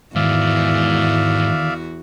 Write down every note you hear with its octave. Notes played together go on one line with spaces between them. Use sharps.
E2 G#2 D#3 F#4 D5 E5 F5